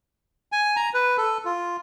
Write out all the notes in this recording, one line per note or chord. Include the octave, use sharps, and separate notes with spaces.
G#5
A#5
B4
A4
F4